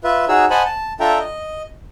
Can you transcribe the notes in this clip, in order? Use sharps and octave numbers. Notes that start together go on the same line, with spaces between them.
F4 B4 E5
D#4 F#4 G#4 C#5 E6
C5 D#5 F#5 G#5 A5 B5
A5
D4 F4 A4 E5 G5 A#5
D#5